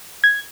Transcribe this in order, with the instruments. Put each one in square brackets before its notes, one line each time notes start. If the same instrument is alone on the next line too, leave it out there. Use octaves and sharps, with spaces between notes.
[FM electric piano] G#6